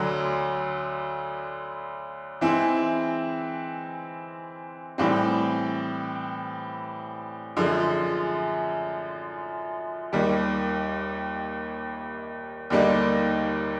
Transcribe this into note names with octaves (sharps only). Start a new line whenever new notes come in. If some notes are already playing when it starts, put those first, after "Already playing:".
Already playing: D2 D3 F#3
E3 G#3 C4 E4 G#4
A2 E3 G3 C4
F#2 D3 F3 G#3
D#2 D#3 G3
D#2 D3 G3 A#3 D#4